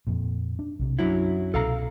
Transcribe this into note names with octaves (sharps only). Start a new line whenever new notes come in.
F2 A#2
D4
B1 C3
F#2 F#3 D4 E4
C2 B2 C#4 A4 F5 A#5